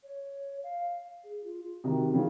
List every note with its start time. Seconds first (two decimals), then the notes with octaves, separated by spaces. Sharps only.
0.03 C#5
0.63 F5
1.24 G#4
1.44 F4
1.64 F4
1.84 C3 D#3 F#4
2.14 C#3 F3